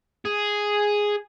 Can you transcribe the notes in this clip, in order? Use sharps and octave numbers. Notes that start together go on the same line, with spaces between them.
G#4